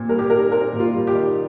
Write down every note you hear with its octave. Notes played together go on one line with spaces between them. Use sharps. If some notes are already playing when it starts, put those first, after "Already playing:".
Already playing: A#2 C4
G3 A#4
G4
D#4 A#4
C4 A#4
A#2
F4
G3
G4
D#4